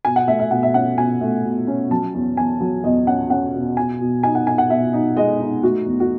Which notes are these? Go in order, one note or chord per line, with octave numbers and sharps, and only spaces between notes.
B2 G#5
F#5
A3 E5
E5
B2 F#5
E5
C#4 F#5
B2 G#5
A3
B2
C#4
F#3 A5
E2
E2 G#5
F#3
E2 D#5
C#4 F#5
C#4 F#5
B2
B2 G#5
B2
D#4 G#5
F#5
D#4 G#5
F#5
B2 E5
D#4
G#3 D#5
D#4
A3 F#4
E2
F#4